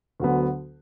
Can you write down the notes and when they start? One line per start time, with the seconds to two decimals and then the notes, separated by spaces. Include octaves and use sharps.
0.20 D2 D3 F#3 B3